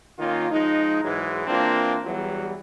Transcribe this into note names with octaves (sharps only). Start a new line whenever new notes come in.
D#3 A#3 C#4 F4
F3 G#3 D#4
G#2 E3 F#3 G#3
E3 A#3 C4 D4 F4
E2 E3 F#3 G3